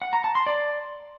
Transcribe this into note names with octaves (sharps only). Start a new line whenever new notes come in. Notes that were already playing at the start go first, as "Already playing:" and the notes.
F#5
A#5
A5
C6
D5